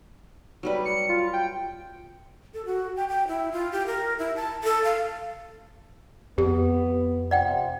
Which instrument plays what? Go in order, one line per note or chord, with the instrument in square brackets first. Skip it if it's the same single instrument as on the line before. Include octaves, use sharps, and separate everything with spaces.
[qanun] F#3 G3 B4
[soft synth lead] C#7
F4
G5
[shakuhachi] A4
F#4
G5
G5
E4
F4
G4
A#4
E4
A5
A4
F5
[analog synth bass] F2 [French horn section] B3 [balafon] G4
[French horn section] C3 F4 [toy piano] D5 F#5 G5